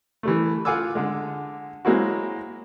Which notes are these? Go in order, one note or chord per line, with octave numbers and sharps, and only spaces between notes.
E3 G3 A3
F4 F5 F#5 G#5 D6 E6
D3 G#3
F#3 G#3 A#3 C4 E4 F#4